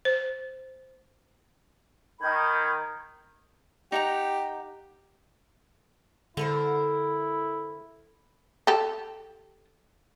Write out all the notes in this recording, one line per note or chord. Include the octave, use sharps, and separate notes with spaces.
C5
D#3 B5 G6 G#6
D#4 G4 F#5 A#5
D3 E4 A4 A#4 C5
G4 A4